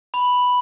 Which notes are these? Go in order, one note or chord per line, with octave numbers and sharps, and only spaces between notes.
B5